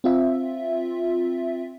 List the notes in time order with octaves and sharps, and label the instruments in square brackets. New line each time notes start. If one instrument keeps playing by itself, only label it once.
[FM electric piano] C4 F4 E5